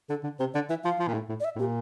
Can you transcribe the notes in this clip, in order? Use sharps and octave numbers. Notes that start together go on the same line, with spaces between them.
D3 A4
D3
C3 C5
D3 D5
E3 E5
F3 F5
F3
A#2
A2
A2
D5
E5
A2
A#2 G4